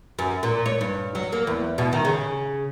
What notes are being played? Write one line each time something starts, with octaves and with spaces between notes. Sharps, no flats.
F#2
A#2
C#5
G2
F#3
A#3
E2
B2
D#3
C#3